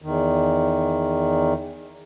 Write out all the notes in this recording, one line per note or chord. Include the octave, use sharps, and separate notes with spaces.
E2 D#3